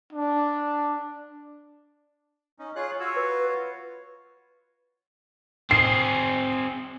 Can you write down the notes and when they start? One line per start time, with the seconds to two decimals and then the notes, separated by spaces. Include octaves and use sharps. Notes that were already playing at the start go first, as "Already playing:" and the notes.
0.13 D4
2.59 C#4 D#4
2.76 F4 G#4 C#5 F#6
3.00 F4 F#4 C#5 E6
3.16 B4
5.71 C4 G#4 C7